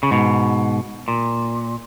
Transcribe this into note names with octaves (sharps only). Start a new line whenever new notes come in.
C#3
G#2 B2
A#2